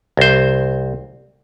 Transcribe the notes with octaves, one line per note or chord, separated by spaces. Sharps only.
C2 C5